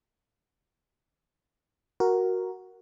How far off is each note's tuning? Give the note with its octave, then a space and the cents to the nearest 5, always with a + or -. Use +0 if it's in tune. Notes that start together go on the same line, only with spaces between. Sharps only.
F#4 +0 A#4 +0